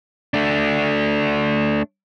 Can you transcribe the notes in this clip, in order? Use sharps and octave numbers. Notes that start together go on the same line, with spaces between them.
A3 D4